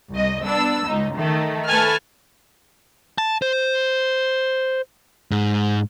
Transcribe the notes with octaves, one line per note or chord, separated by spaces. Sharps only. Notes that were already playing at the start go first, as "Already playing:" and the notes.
C2 D#5
B3 D4 E6
C#2 D#4
D#3 A3
A3 A4 B4 G#5 A5 F6
A5
C5
G#2